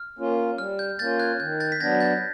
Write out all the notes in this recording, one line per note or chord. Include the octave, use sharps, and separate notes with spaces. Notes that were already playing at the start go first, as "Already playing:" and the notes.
Already playing: F6
A#3 C#4 F4
G3 F6
G6
A#3 C#4 F4 G6 A6
F#6 G#6
D#3 G6
G6 A6
B6
F#3 B3 D4 G#6 A#6
G6 A6